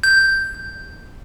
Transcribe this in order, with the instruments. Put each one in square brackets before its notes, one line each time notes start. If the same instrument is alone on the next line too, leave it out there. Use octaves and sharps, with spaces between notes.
[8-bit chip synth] G6